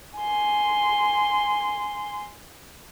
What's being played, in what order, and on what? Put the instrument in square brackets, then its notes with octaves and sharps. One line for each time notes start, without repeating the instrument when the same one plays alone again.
[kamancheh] G#5 C6